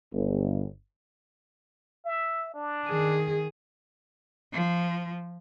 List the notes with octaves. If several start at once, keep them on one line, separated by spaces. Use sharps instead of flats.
G1
E5
D4
D#3 G#4
F3